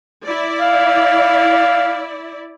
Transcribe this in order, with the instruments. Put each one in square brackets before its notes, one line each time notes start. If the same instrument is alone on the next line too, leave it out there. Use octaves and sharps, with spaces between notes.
[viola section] E4 D5
[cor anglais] F5